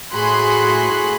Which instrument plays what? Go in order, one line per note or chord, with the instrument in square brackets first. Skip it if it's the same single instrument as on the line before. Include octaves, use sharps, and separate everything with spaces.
[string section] A2 F#4 G#4 B5 C6 F#6